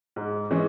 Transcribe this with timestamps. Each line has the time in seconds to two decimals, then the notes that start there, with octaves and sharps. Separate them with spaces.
0.16 G#2
0.51 E3 G#3 C#4